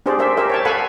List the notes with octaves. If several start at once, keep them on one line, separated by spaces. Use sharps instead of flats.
D4 G4 G#4 C5 D5
G4 A#4 C5 E5
G4 A#4 C5 E5
C#5 G5 A5
A4 F5 F#5 G#5 B5 C#6